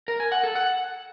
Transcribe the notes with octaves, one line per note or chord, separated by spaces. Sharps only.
A#4
G#5
F#5
A4
F#5